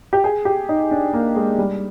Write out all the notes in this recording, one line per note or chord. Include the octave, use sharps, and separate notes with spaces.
G4
G#4
G4
D#4
D4
A#3
G#3
G3